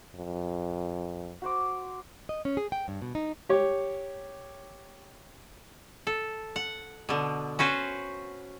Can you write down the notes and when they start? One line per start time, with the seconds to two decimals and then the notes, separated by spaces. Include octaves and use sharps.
0.15 F2
1.42 F#4 C5 D6
2.29 D#5
2.45 C#4
2.57 G#4
2.72 G5
2.88 G2
3.02 B2
3.15 D#4
3.49 G4 C#5
6.07 A4
6.56 F#5
7.09 B2 D3
7.59 C#4 F#4 B4 C5